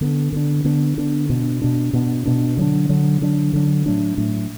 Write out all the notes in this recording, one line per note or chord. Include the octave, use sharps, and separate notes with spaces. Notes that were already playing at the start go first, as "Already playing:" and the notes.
D3 B3 D4
D3 B3 D4
D3 B3 D4
D3 B3 D4
B2 B3 D4
B2 B3 D4
B2 B3 D4
B2 B3 D4
D3 F#3 D4
D3 F#3 D4
D3 F#3 D4
D3 F#3 D4
A2 F#3 A3 D4
A2 F#3 A3 D4